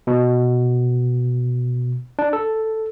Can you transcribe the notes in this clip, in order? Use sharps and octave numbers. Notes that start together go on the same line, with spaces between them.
B2
D4
A4